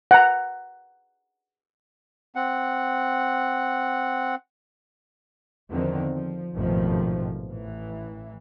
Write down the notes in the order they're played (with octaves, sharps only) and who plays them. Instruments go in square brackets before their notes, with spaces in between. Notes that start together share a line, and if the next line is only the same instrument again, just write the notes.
[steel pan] F#5 A#5
[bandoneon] C4 F#5
[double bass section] E2 D3 D#3 F3 C4
F3
A1 F2 G#2 B2 D#3 F3
A1 E3